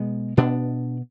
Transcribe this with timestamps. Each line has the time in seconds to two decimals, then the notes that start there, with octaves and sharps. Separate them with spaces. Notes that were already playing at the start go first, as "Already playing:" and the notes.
Already playing: B2 G#3 B3
0.37 B2 B3 D4